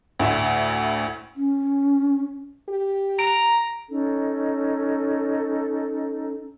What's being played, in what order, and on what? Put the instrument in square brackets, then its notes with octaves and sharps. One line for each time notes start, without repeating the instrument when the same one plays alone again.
[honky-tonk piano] D2 A2 E4
[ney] C#4
[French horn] G4
[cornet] A#5 [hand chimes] D7
[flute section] C#4 D#4 A4